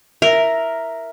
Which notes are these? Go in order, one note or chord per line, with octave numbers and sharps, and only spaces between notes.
A#4 E5